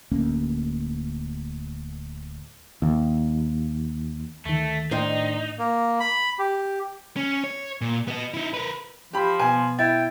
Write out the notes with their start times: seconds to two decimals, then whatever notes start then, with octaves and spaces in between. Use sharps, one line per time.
0.11 D1 D2 A#3 C#4
2.82 D#2
4.45 D2 D#3 A3
4.91 A2 D#3 D4 D#4 C5
5.58 A#3
6.00 B5
6.39 G4
7.16 C#4
7.44 C#5
7.81 A#2
8.08 B3 D#5
8.34 D#4 E4
8.54 A#4 B4
9.13 F3 G4 B5
9.40 B2 B3 G#5
9.79 E4 G5 G#6 A6